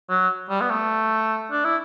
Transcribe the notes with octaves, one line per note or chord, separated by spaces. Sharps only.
F#3
G3
B3
A3
D4
E4